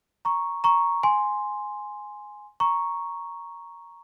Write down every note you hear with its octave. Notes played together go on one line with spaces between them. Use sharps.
A#5 C#6
A#5 C#6
G#5 C6
A#5 C#6